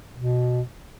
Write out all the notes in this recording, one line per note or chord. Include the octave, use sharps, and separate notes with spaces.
B2